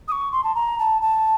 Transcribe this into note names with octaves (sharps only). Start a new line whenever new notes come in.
D#6
C#6
C6
A5
A#5
A5
A5